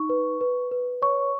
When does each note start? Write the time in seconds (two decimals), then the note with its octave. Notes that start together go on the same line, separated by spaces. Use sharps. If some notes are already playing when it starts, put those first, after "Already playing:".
Already playing: D#4 C#6
0.09 B4
0.41 B4
0.72 B4
1.02 C#5 C#6